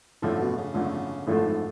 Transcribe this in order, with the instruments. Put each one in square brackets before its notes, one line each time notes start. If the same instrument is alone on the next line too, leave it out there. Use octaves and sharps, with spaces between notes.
[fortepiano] G#1 F#2 D3 F3 A3 [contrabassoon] A2
[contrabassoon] B2
C#3
[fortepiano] G#1 F#2 D3 F3 A3
[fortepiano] G#1 F#2 D3 F3 A3 [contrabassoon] A2
[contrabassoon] G#2